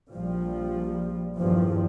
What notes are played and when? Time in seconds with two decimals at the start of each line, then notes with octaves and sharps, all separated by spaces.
0.11 A#1 F3 G3
1.39 E2 G2 D#3 F3